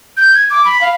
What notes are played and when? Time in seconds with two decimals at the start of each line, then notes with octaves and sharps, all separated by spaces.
0.17 G6
0.34 G#6
0.50 D6
0.65 B5
0.81 F5